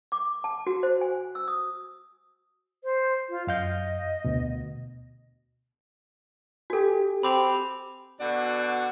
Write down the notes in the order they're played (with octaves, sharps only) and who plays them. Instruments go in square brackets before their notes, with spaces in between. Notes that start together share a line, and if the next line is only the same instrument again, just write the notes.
[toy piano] D6
A5
F#4
C5
G#5
E6
D#6
[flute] C5
F4
[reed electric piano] F#2 F5 G6 [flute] D#5
[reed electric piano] D2 B2
[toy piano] F#4 A4 [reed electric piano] G4 G#5
[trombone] C4 [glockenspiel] B5 D6 F7
[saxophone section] B2 D3 F#4 D5 F#5